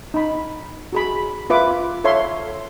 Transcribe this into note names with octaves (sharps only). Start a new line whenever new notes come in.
D#4 B5
F#4 G#4 B5
F4 B4 E5 D6
A4 C#5 E5 F5 C6